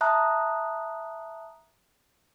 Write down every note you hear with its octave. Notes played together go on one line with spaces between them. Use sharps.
E5 A5 A#5 D#6 F#6